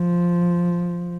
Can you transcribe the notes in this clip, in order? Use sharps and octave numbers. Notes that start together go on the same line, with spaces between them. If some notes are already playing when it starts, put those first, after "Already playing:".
Already playing: F3